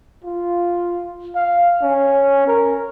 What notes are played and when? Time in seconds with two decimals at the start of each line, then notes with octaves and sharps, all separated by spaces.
0.24 F4
1.35 F5
1.82 C#4
2.47 A#4